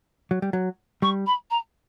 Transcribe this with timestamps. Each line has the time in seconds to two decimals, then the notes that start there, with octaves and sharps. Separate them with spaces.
0.31 F#3
0.42 G3
0.53 F#3
1.02 G3 C#6
1.26 B5
1.51 A#5